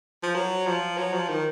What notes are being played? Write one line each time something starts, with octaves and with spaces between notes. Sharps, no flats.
F3
F#3
F3
F#3
F3
D#3